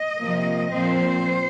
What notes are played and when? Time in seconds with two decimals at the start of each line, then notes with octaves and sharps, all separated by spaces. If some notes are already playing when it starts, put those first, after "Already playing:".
Already playing: D#5
0.19 C3 F3 A#3
0.72 A#2 F3 C4 C5